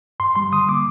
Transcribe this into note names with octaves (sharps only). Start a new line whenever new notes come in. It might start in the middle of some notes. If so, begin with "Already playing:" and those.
G2 C6
G3 C6
D3 D#6
A#3 D6